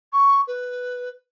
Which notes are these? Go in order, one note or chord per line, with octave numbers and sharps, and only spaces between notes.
C#6
B4